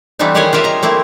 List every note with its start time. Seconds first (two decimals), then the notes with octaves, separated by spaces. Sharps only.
0.19 E3 G3 A3 B3 C4 D#4
0.35 D#3 G4 G#4 C#5 F#5 G#5
0.53 F4 G4 A#4 E5
0.64 D#5 A#5
0.83 A3 A#3 C4 E4